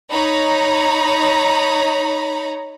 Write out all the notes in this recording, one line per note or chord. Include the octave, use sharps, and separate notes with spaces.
D#4 C#5 A#5 B5